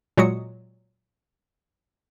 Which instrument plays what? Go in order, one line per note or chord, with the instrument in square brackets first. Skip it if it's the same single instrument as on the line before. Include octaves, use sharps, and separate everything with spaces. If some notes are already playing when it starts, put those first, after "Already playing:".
[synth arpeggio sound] A#2 F#3 G#3 F#4 D#6 C#7